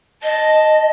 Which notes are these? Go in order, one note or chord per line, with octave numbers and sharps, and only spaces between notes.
D#5 A5